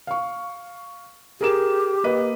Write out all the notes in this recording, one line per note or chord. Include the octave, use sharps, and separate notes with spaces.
F5 C#6
G4 G#4 A#4 E7
A#3 B4 D#5